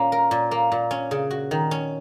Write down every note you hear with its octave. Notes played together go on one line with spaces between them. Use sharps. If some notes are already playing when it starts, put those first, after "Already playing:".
Already playing: A#2 A#3 C#4
A#4
A#2
A#3
A#2
C#4
C#3
F#4
D#3
C#4